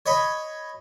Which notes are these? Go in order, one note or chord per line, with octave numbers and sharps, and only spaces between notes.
C#5 D#5 B5